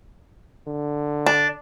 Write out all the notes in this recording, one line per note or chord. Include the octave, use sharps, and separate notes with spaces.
D3
D4